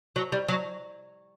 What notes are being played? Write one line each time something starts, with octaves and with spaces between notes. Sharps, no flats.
F#3
G3
F#3